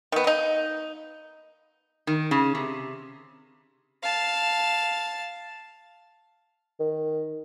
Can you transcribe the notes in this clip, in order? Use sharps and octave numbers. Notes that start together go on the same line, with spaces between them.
D#3 B3
A#3 D#4
D#3
C#3
C3
F5 A5
D#3